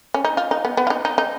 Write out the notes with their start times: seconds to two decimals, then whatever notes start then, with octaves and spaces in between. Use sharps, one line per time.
0.14 C#4
0.25 D#4
0.37 F4
0.51 D#4
0.65 B3
0.77 B3
0.87 F4
0.90 D#4
1.05 D#4
1.18 D#4